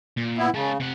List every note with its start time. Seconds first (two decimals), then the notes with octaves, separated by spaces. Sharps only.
0.17 A#2
0.38 B3 E4
0.54 C#3 G#3 A5
0.80 C3 F#5